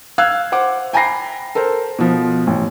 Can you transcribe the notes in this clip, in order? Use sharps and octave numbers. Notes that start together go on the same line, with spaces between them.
F5 E6 F#6 G#6
C5 F#5 D6
G5 G#5 A#5 B5 A#6 C7
A4 A#4 C5
B2 F3
A1